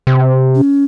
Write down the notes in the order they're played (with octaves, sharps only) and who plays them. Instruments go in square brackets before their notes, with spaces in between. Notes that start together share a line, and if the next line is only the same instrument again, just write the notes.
[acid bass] C3
[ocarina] C#4